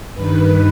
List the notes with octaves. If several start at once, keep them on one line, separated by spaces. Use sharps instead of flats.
G2 D#3 B4